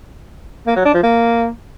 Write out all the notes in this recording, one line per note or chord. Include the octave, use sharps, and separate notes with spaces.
A#3
F#3
D4
F3
A#3